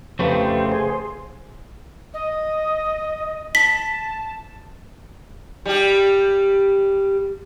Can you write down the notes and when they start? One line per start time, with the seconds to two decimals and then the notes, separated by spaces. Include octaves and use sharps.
0.19 F2 C#3 A3 G4 B4 C5 F5
0.72 G#4 C5
2.13 D#5
3.55 A5 B6
5.66 G3 G4